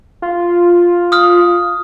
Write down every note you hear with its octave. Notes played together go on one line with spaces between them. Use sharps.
F4
D#6 F6